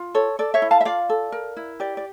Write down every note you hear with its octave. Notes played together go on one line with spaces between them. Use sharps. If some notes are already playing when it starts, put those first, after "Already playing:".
Already playing: F4
A4 C#5
A4 D5
C#5 E5
E4
F5 A5
E5
F4 D5 F5
A4
A#4
E4
G4 D5
D5